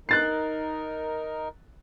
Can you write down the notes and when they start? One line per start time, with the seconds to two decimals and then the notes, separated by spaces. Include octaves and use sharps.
0.09 D#4 A#4 F#6 A6 C7